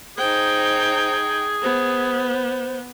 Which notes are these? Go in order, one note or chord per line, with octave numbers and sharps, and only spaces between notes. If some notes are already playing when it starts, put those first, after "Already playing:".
D#4 G#4 C5 G5
B3 C5